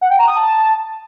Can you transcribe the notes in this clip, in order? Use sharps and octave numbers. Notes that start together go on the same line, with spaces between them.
F#5
G5
A#5
D#6
A5